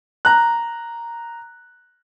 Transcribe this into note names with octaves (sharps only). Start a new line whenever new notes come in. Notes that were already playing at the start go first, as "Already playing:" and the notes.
A#5 F#6